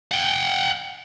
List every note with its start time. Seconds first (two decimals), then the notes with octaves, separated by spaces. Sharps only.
0.11 F#5 G5